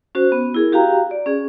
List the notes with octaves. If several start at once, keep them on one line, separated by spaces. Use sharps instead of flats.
C#4 F#4 C5
B3
E4 G#4 A#4
F#4 G4 F5 G5 A#5
D5
C#4 G#4